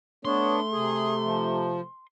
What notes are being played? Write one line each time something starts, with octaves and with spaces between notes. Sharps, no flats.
A3 B3 D4 C#5 C6
C3 G#4
F3